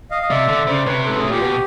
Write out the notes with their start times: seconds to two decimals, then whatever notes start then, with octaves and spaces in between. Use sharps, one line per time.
0.11 D#5 F5
0.22 D#5
0.30 C3 D5 E5
0.48 D3
0.67 C#3 C5 D5
0.86 C3 B4 C#5
1.05 G#2 A4 B4
1.17 A2 G#4
1.30 A#2 G4
1.42 B2